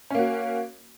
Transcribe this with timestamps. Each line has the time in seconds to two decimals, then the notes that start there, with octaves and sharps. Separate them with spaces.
0.10 C#4
0.15 A#3
0.19 F#4